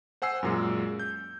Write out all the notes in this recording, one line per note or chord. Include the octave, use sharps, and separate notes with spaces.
C5 F#5 G#5 E6 C7
F#2 A#2 G#3
G6